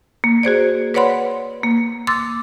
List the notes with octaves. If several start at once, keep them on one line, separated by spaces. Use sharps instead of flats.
A#3
F#4 G#4 C5 D5
B4 C#5 D5 F#5 B5 C6
A#3
C6 D6 E6 A6